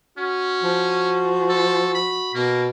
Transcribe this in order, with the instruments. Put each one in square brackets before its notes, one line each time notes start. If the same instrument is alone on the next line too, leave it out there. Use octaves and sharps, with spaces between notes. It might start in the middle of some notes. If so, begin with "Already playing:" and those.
[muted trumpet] C#4 [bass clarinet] F#4
[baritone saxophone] F3
[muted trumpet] A4
B5
[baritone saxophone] B2 [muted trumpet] A#3